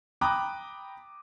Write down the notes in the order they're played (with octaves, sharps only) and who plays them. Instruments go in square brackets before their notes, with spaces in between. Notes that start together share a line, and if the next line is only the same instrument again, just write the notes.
[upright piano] G5 A#5 B5 D6 D#6 F#6